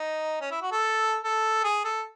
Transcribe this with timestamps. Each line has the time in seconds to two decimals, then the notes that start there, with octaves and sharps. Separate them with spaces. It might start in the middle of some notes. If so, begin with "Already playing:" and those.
Already playing: D#4
0.41 C#4
0.51 E4
0.62 F#4
0.71 A4
1.23 A4
1.64 G#4
1.84 A4